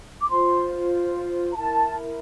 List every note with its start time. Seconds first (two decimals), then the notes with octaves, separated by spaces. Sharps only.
0.21 D6
0.29 F4 C5 C6
1.51 A#5
1.55 E4 A#4 A5